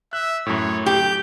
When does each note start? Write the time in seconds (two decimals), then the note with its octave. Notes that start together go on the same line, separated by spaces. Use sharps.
0.13 E5 F#6
0.46 F#2 A2 C#5
0.86 G4 G6